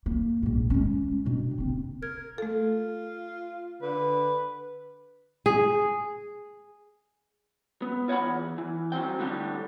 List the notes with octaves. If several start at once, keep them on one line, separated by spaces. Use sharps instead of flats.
A#3
A#1 G#2
G#3 C#4
B2 D4
F#1 C4
A#4 G#6
A3 F4 A4
D3 B4
G#4
B3
F4 C#5 D#5 F#5 B5
E2
E3
F#3 G3 C4 G5
A2 D3 G3 D4 G4